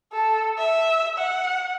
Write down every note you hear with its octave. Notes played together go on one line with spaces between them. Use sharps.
A4
E5
F#5